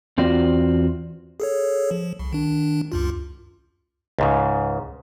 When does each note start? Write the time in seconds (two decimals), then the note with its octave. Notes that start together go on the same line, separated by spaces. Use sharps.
0.18 E2 C4 F4 F#4 D5
1.40 G#4 A4 C#5
1.91 F3
2.19 C2
2.33 D#3 D4
2.92 C#2 F#2 F4
4.19 C#2 G#2 C#3